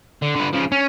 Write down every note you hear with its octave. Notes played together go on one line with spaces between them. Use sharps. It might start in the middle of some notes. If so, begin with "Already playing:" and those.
D3
D3 B4
C#3 F3
C#4